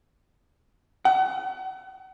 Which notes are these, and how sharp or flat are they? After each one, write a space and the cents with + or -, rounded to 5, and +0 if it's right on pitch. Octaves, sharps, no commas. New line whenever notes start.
F#5 +35